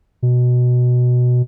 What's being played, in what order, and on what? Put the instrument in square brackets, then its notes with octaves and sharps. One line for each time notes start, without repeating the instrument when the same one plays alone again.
[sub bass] B2